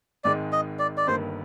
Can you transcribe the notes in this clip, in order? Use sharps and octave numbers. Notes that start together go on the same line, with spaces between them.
G#1 G#2 D#3 G#3 D5
D#5
D5
D5
G1 G2 D#3 A#3 C5